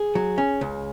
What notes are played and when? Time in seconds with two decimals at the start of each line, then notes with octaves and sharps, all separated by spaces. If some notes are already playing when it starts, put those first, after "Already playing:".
Already playing: G#4
0.15 F#3
0.38 C#4
0.61 C#2